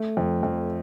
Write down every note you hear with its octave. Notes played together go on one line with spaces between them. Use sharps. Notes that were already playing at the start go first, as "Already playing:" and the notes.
Already playing: A3
F2
F2